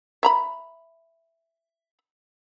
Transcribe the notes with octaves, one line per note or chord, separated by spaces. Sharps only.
E5 A#5 B5